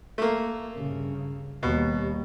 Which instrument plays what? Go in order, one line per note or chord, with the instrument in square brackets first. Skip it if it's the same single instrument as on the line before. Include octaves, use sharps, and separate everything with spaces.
[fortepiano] A3 A#3
[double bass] G2 C#3
[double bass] D#2 G3 [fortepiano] B2